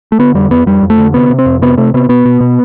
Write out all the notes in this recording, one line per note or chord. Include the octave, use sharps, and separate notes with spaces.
A3
D3 B3
F2 G3
F2 B3
F2 G3
F2
A3
D3
C3 B3
C3
C4
F2
C3 B3
C3 A3
C3 B3
B2 B3
B2
B2